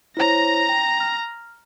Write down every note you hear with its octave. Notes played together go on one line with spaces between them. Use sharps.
E4 C5 C#5 A#5 A#6
G5
F6